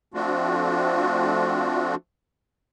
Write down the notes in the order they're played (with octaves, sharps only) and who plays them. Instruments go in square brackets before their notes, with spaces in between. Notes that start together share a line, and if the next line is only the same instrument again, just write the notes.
[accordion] F3 A3 C4 D4 F4 F#4